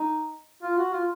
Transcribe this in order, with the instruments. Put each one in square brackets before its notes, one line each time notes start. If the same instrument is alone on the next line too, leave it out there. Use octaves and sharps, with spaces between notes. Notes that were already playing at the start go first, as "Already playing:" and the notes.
Already playing: [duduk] D#4
F4
F#4
F4